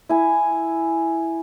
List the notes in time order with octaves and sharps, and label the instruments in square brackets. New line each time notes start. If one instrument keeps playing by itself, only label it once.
[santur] E4 G#5